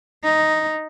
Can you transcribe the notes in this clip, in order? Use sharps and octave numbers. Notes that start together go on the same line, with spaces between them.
D#4